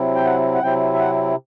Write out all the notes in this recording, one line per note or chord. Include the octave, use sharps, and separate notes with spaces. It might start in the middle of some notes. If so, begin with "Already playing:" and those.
Already playing: C3 F#3 C4 E4
G5
F#5
F#5
C3 F#3 C4 E4 G5
E5
F#5